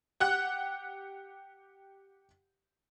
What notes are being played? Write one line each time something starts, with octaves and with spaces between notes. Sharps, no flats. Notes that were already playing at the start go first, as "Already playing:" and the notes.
G4 F#5 F#6